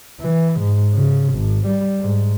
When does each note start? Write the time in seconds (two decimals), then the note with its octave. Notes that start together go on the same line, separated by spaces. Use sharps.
0.20 E3
0.60 G#2
0.94 C#3
1.34 G#1
1.66 G3
2.00 G#2